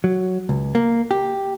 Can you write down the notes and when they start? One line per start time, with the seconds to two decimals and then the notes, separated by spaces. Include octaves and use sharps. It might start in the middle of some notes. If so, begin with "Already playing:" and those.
0.04 F#3
0.49 C#2
0.75 A#3
1.11 G4